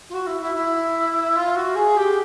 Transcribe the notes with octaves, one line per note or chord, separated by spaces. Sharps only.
F4
F#4
E4
E4
E4
F4
F#4
G#4
G4